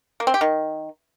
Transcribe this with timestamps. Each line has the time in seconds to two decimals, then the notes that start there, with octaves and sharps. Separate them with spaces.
0.20 A#3
0.27 C4
0.34 G4
0.41 D#3